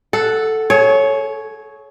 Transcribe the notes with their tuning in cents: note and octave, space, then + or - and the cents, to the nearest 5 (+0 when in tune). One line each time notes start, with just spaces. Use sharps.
A4 +0 F#5 +0
G#4 +45 C#5 +0